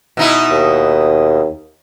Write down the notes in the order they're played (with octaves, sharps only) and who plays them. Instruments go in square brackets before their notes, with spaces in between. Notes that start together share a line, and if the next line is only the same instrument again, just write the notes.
[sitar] B2 D#4 E4
[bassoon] D#2